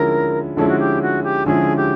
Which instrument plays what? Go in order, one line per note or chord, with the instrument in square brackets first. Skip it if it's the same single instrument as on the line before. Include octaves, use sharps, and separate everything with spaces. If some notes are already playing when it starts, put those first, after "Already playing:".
Already playing: [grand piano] D3 F3 G#3 C#4 E4 [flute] A#4
[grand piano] D3 F3 G#3 C#4 E4 [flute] A4
[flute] F#4
G4
F#4
G4
[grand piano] D3 F3 G#3 C#4 E4 [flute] G#4
[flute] G4